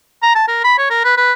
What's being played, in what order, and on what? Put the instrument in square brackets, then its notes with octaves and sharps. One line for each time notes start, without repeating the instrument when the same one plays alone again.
[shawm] A#5
A5
A#4
B5
C#5
A#4
B4
B4